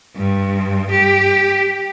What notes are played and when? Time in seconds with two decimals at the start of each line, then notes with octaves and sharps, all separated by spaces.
0.16 G2
0.91 G4